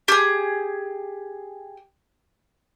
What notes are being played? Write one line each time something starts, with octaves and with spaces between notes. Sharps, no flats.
G4 G#4